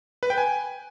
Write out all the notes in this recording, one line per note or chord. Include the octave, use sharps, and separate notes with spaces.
B4
G5
G#5